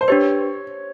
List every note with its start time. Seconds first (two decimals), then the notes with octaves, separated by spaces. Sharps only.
0.01 C5
0.08 D4 G4 B4 C#5